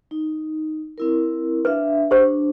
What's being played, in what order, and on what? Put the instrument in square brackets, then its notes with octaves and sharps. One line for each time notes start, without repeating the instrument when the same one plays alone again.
[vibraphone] D#4
C4 E4 A#4
[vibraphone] D4 E5 F5 [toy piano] B4
[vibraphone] D4 [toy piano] G4 C5